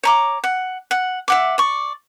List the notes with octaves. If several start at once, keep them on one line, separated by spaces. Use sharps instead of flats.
C#5 A#5 D6
F#5
F#5
E5 F#5 D6
D5 C#6